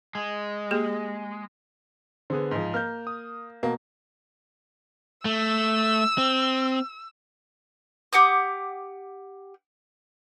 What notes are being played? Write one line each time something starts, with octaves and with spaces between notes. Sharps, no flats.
G#3
A#3 G4 G#4
D3 B3 G#4 C5
G#2 F3
A#3 F6 G6
D#6
B2 A#3
A3 E6
C4
G4 F#5 D6 D#6